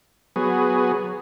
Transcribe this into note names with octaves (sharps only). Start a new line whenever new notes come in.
F#3 B3 G#4